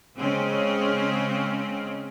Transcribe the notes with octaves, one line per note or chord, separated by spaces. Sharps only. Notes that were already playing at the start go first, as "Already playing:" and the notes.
C#3 G#3 C4 C#4